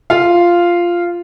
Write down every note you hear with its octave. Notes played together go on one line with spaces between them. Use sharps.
F4 F5